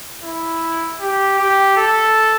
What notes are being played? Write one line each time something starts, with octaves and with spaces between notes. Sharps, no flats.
E4
G4
G4
A4